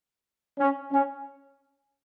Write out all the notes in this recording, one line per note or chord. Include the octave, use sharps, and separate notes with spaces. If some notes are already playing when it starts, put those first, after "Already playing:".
C#4
C#4